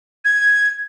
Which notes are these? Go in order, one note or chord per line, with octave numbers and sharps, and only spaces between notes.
G#6